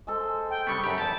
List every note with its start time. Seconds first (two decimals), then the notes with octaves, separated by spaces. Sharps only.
0.07 G#3 A4 C5
0.50 G5
0.67 C#3 G3 B3 C#6
0.84 F#2 G4 B5
0.98 E2 G4 A5